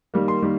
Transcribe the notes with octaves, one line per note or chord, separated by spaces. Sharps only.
D#3 G3 A#3
C6
D#3 G3 A#3